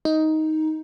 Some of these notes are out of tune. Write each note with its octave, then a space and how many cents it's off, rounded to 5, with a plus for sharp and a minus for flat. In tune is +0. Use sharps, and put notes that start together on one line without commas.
D#4 +10